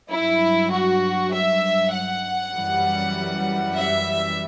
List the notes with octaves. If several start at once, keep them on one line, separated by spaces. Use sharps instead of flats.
G2 F#3 E4
F#4
E5
F#5
F#2 E3 G3
E5